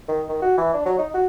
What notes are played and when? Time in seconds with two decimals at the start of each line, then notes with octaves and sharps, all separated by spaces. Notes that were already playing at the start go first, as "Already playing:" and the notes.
0.08 D#3
0.29 D#3
0.42 F#4
0.57 E3
0.74 D4
0.86 F#3
0.98 D#4
1.14 F#4